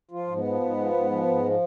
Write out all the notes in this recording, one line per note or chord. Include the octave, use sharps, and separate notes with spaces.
F3 F4
G#2
B3
F3
G#2
F3
G#2
F3
G#2
F3